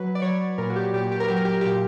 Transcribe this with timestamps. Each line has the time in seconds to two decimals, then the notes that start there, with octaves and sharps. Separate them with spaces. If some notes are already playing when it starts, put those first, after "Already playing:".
Already playing: F#3 B4
0.15 D5
0.22 F#3 C#5
0.58 A#2 A#4
0.70 F#4
0.76 G4
0.93 A#2 G4
1.12 G4
1.20 A#4
1.28 F#3 G4
1.37 A#4
1.45 G4
1.53 A#4
1.61 A#2 G4